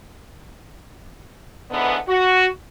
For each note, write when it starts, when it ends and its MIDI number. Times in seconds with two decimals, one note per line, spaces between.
1.70 1.96 44
1.70 1.96 50
1.70 1.96 52
1.70 1.96 59
2.07 2.46 66